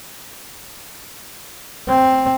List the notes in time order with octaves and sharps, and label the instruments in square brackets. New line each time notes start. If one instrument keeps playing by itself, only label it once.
[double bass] C4